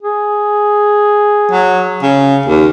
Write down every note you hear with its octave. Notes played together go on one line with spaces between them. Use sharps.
G#4
F#3
C#3
D#2